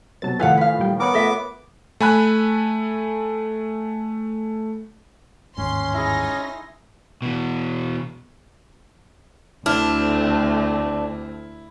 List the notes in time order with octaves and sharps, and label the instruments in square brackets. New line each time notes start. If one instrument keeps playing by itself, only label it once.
[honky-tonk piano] B2 F#3 C4 [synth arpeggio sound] A5 A6
[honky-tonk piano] A2 D#3 F3 [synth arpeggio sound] A4 G#5 [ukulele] B4 F5 F#5
[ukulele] B4 F5
[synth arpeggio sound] A#2 G3 G5
[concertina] B3 D6 [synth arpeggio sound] A#4 C#5 F#5
[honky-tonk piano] A3 F4 [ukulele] A4 D#5 E5
[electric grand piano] A3 G#5 B5 F#6
[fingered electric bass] G1 D#2 G#2 [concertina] C#4 [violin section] C6
[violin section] D#4 C6 A#6 [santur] E4 G#4
[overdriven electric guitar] B2 E3
[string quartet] D2 [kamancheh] A3 C4 [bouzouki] D4 [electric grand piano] E4 F6